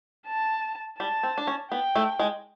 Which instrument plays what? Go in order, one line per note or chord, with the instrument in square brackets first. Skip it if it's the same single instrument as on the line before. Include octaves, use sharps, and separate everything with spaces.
[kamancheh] A5
[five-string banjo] G3 [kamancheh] A5
[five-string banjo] C4
D4
C#4
[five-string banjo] B3 [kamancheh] G5
[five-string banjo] A3
G#3